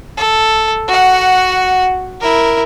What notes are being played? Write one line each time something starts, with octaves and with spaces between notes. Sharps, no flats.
A4
F#4 F#5
E4 A#4